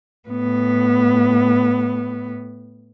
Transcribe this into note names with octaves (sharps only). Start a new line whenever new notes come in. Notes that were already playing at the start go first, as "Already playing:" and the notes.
A2 B3